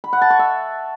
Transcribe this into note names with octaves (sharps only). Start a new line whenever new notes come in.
B5
F#5
A5
C#6
E5